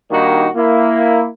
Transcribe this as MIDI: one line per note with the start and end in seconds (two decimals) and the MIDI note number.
0.11 0.48 51
0.11 0.48 55
0.11 0.48 58
0.11 0.48 62
0.11 0.48 63
0.11 0.48 66
0.56 1.27 58
0.56 1.27 64